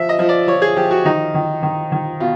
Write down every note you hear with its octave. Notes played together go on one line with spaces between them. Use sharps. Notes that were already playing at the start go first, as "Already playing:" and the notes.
Already playing: F3 E5
D#5
F3
D5
F3 C#5
G#4
F3 G4
F#4
D#3 D#4
D#3
D#3
D#3
B2 F4